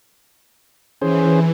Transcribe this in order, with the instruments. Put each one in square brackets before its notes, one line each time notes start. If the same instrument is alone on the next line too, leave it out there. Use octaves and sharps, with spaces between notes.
[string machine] E3 [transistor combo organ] C#4 G#4 C5